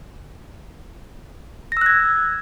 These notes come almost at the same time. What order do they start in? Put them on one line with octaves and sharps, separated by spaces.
A#6 E6 F#6 G#6